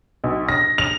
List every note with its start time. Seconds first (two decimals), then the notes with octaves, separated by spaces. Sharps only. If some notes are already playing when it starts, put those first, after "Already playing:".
0.24 B1
0.49 A#6
0.78 F7